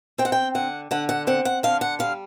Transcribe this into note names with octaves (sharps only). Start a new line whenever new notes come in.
C4 G5
F#5
G5
D3 F#5
D3 F#5
F#5
C4 F#5
F#5
D3 F5
F#5
G3 F5